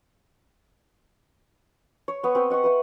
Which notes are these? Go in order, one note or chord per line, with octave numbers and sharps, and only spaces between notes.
C#5
B3 C#6
C4 B4 G5
D#5 F#5 B5 C#6
B4 E5 G5